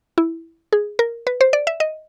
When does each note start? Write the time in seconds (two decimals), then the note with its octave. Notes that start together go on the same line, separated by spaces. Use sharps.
0.18 E4
0.72 G#4
0.99 A#4
1.27 B4
1.41 C5
1.53 D5
1.67 E5
1.80 D#5